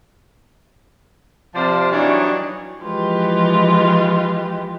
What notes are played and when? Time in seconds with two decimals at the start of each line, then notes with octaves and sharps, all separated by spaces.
1.55 C3 F3 C5 D5 F5 A5
1.92 E3 F#3 G3 D4 D#4 C#5
2.84 E3 F3 G#3 F4 G4 B4